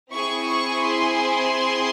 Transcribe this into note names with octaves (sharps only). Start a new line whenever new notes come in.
C4 E4 G#4 C#6
C#6
C6